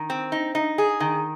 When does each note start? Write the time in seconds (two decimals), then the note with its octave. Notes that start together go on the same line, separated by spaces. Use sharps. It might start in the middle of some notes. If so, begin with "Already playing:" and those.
Already playing: D#3
0.10 C4
0.32 D#4
0.55 D#4
0.78 G#4
1.00 D#3